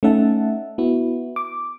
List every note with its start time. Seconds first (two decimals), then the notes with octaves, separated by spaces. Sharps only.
0.03 A3 C#4 D#4 E5 F#5 A5
0.78 B3 E4 F#4
1.36 D6